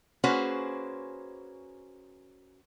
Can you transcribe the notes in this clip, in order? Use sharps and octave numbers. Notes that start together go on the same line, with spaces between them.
A#3 C#4 F#4 G#4 B4 C5